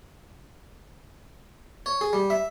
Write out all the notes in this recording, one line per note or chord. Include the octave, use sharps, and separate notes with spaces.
C#5
G#4
G3
E5